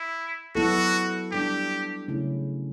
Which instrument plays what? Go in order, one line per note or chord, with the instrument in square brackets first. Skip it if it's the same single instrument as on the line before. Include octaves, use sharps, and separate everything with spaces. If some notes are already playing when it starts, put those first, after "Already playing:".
Already playing: [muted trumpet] E4
[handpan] F#3 B3 E4 A4 [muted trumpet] F#4
[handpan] G3 D4 A4 [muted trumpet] G4
[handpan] C#3 F#3 A3 C#4 E4